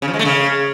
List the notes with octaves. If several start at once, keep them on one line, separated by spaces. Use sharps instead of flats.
C#3
F3
G#3
A3
C#3